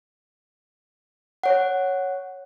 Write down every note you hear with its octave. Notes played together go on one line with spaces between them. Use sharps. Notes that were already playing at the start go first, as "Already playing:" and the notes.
C#5 F#5